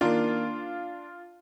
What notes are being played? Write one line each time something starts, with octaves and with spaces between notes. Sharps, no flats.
D#3 A#3 D4 F4